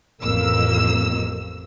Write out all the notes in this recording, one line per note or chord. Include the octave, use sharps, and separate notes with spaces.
A1 F2 A#3 E6